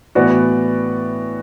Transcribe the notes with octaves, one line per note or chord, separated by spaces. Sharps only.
A2 E3 B3 F#4 D5